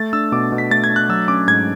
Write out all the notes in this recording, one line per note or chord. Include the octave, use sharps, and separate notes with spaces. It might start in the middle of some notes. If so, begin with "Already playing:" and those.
Already playing: A3 A6
D4 E6
B2 D6
B2
B6
A3 A6
G#6
D4
F#6
F#3 E6
C#4 D6
G#2 G#6